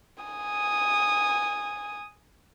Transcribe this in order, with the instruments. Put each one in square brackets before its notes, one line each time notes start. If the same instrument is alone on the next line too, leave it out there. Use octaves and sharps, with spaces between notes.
[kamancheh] G#5 D#6